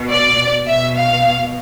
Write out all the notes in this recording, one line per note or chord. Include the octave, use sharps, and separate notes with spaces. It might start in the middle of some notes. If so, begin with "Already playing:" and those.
Already playing: B2
D5
B2 E5
F5